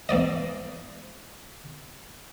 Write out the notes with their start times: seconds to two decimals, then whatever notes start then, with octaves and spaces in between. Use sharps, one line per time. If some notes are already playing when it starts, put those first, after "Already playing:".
0.09 E2 G#2 D5 D#5